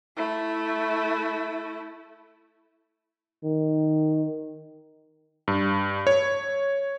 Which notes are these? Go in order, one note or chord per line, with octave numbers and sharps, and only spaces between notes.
A3 E4
D#3
G2
C#5